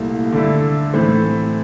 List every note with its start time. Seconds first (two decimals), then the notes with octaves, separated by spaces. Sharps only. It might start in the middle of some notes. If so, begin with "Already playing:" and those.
Already playing: C2 A#2 A3
0.32 D3 A3 E4
0.94 A2 E3 A3 C4